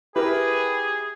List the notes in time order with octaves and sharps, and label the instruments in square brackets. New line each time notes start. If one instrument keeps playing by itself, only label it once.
[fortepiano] E4 A#4 [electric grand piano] G4 [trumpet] G#4 [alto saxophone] B4